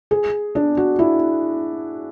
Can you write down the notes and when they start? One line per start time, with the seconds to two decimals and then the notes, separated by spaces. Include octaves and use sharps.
0.11 G#4
0.55 D4
0.77 F#4
0.99 E4